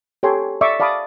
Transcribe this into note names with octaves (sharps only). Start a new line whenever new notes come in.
G4 A4 C#5 G5 G#5 C6
D5 E5 C#6 D6
D5 F5 A5 B5 D6 D#6